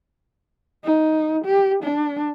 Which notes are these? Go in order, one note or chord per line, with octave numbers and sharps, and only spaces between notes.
D#4
G4
D4